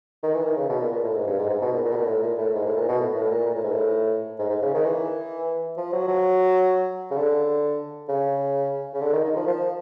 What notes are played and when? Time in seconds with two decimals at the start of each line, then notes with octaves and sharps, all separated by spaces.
0.23 D#3
0.34 E3
0.46 D#3
0.57 C#3
0.69 B2
0.80 A#2
0.92 A#2
1.04 A2
1.15 G#2
1.27 G2
1.38 G#2
1.49 G#2
1.62 B2
1.73 A#2
1.85 A#2
1.92 B2
1.96 A#2
2.07 A2
2.22 A#2
2.38 A2
2.54 G#2
2.66 A2
2.77 A#2
2.89 B2
3.00 A2
3.16 A2
3.31 A#2
3.46 A#2
3.55 A2
3.63 G#2
3.72 A2
4.39 G#2
4.50 G#2
4.62 C#3
4.74 D#3
4.85 E3
5.77 F3
5.93 F#3
6.08 F#3
7.11 C#3
7.17 D3
8.09 C#3
8.94 C#3
9.01 D3
9.13 D#3
9.24 D#3
9.36 F3
9.48 F3